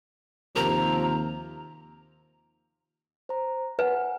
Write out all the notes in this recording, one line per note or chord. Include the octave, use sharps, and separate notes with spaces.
D#2 C3 F3 A#4 A#5 F7
C5 A#5
B4 F#5 G#5